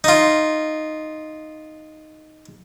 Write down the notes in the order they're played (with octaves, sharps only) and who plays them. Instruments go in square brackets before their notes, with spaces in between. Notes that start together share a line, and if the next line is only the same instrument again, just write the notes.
[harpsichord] D#4 F4